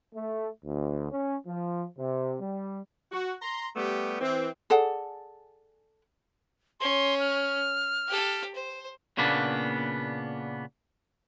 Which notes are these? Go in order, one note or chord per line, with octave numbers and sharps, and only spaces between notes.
A3
D2
C#4
F3
C3
G3
F#4
A#5 C6
G3 A3 B3 G4
E3 C4
G#4 A4 D5 F#5
C#4 C6
F6
G4 A4
C5
A#2 C#3 A#3 B3 D4